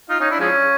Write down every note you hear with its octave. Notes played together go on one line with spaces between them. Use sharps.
D#4 F4
C#4 D#4
D4 E4
F3 G#3 C#4